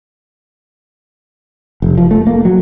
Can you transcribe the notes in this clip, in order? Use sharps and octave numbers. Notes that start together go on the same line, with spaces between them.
F1
F3
A3
A#3
F#3